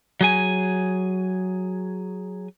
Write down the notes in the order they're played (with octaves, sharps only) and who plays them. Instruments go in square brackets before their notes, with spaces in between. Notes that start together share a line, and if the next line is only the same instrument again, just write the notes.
[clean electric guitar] F#3 G#4 G#5